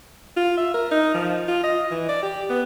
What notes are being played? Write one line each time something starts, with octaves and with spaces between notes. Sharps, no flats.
F4
E5
A#4
D#4
F3
F4
D#5
E3
D5
G4
B3